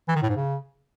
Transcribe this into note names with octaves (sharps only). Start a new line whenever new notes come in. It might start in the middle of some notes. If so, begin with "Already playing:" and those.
E3
D#3
A2
G#2
C#3